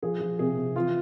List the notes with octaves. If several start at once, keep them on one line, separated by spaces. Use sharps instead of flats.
F3 G#4
F3
C3 G#4
C3
E3 F4